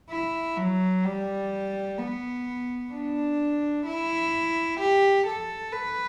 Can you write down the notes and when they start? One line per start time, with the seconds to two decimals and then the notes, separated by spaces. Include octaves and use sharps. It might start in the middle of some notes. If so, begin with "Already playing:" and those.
0.10 E4
0.57 F#3
1.04 G3
1.98 B3
2.92 D4
3.86 E4
4.80 G4
5.27 A4
5.73 B4